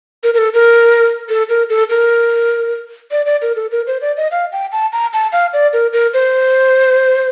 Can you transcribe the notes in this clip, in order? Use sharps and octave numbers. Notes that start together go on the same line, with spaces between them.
A#4
A#4
A4
A#4
A4
A#4
A4
A#4
D5
D5
A#4
A4
A#4
C5
D5
D#5
F5
G5
A5
A#5
A5
F5
D5
A#4
A#4
C5